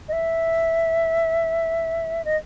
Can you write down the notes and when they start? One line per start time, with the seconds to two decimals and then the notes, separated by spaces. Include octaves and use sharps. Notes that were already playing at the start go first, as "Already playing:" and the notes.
0.08 D#5
0.13 E5
2.25 D#5